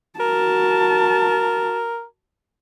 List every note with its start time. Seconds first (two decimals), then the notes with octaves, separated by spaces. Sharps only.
0.20 F#4 A#4 A5